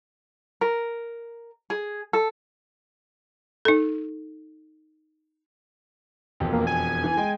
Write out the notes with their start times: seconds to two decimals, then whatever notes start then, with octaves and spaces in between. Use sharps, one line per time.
0.61 A#4
1.70 G#4
2.13 A4
3.65 D#4 A4
6.40 E1 F2
6.53 A#3
6.67 G#5
7.04 E3
7.17 G#3 G5